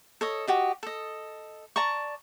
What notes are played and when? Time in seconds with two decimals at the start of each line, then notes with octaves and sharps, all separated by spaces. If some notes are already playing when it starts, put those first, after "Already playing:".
0.21 A4 C#5 D#5
0.47 F#4 G4 D#5
0.83 A4 D#5
1.76 D5 A5 A#5 C#6